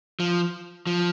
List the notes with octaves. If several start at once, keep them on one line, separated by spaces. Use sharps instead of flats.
F3
F3